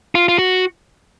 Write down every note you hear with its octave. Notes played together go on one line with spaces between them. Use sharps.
F4
F4
F#4